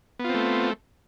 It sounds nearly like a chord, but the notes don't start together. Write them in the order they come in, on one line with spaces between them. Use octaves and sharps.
B3 F4 C4 A3